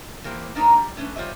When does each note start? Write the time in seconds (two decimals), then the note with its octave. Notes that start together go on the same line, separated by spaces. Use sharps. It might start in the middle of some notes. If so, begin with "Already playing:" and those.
0.24 E3 A#3 G4 C5
0.55 A#3 D4 D#4 A#4 B4 C#5
0.77 G3
0.97 A3 C#4 D4 B4
1.16 G3 F4 C5 C#5 D#5 E5